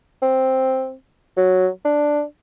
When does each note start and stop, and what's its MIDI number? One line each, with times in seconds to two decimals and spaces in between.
0.22 0.94 60
1.37 1.68 54
1.85 2.22 62